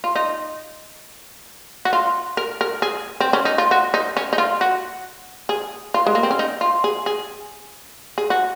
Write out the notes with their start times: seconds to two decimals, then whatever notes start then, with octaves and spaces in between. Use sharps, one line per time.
0.04 F4
0.16 D#4
1.85 F#4
1.93 F4
2.37 A#4
2.61 A#4
2.82 G#4
3.20 C4
3.33 C#4
3.45 D#4
3.58 F4
3.71 F#4
3.94 D#4
4.17 C#4
4.33 D#4
4.38 F4
4.61 F#4
5.49 G#4
5.94 F4
6.06 G#3
6.15 A#3
6.23 C4
6.31 C#4
6.39 D#4
6.61 F4
6.84 G#4
7.06 G#4
8.18 G#4
8.30 F#4